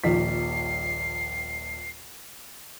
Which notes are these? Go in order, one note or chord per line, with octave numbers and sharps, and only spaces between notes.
D#1 A#1 B6 C7